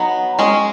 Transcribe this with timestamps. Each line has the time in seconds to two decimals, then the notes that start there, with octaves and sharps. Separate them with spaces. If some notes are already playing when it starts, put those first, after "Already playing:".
Already playing: F#3 B3 D#4
0.39 G#3 C#4